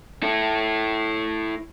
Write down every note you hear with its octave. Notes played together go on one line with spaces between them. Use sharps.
E4 A4